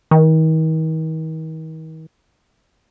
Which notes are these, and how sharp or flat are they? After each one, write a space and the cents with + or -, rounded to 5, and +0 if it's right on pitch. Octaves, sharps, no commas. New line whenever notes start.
D#3 +40